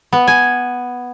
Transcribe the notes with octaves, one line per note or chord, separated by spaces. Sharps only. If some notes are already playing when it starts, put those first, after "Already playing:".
B3
G#5